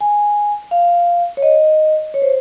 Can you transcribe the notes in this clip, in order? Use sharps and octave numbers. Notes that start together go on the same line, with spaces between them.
G#5
F5
C#5
D#5
C#5
C5